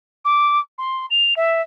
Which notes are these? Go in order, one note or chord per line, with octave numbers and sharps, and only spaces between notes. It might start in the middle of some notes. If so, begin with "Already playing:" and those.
D6
C6
F7
E5